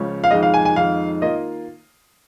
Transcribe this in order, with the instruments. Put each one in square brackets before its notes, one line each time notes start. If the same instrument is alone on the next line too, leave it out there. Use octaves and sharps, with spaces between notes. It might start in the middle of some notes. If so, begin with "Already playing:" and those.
Already playing: [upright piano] C#2 C#3 F3 C#4
[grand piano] F5
[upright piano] F2 D#3 G#3 D#4 [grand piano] D#5
[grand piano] F5
G#5
G#5
[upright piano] F2 D#3 G#3 D#4 [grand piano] F5
[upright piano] D#3 A#3 F4 [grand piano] D#5